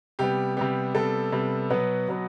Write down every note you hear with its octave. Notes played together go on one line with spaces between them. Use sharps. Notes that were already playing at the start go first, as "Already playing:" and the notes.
C3 G3 B3 G4
C3 G3 B3 G4
C3 G3 B3 A4
C3 G3 B3
B2 F#3 B3 B4
B2 F#3 B3